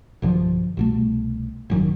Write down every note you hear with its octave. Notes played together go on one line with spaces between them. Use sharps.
B1 G2 D3 F3
C2 B2 A3
G#1 F#2 D#3